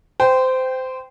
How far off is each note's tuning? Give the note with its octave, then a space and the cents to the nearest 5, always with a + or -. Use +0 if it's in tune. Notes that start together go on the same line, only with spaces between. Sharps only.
C5 -20 G5 +0